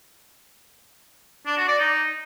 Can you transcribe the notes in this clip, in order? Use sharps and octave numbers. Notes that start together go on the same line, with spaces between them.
D4
F#4
D5
D#4